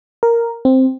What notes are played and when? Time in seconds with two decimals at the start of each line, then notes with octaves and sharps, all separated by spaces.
0.23 A#4
0.65 C4